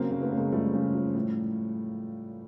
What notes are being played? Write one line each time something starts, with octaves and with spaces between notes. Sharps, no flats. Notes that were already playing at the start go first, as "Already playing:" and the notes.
Already playing: C#3 F#3 A#3 C4
C#3
A3 B3
C#3
G#3 A#3
F3 G3 A3
C#3
F3
A2